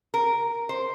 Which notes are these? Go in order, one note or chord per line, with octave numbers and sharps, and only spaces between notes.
A#4
C5